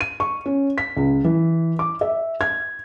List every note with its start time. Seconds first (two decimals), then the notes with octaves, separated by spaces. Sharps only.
0.01 D#7
0.20 C#6
0.46 C#4
0.78 B6
0.97 C#2
1.24 E3
1.79 D6
2.01 E5
2.41 G#6